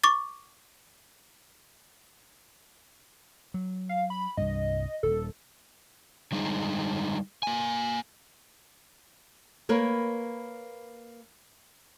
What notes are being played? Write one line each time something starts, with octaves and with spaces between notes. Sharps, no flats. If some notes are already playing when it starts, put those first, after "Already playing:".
C#6 D6 A6
F#3
F5
B5
C2 G2 D#5
D#1 D#3 A4
D3 G3 G#3 D#4
A#3 G#5
A#3 A#4 B4 C#5